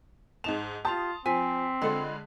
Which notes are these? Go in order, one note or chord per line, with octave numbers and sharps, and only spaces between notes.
G#2 D#4 A5 F7
F4 G4 A5 C6 D#6 F7
F3 C4 G#5 B6
D3 G#3 F4 A4 B5